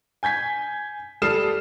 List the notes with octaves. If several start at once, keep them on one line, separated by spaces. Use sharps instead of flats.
G#5 G6 G#6 B6
G3 A4 D#6 F6 C7 E7